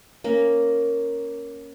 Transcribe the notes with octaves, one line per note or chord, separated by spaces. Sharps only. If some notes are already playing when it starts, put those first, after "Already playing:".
A#3 C#4